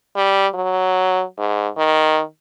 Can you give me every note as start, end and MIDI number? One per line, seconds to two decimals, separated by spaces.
0.16 0.47 55
0.54 1.23 54
1.38 1.68 44
1.77 2.22 51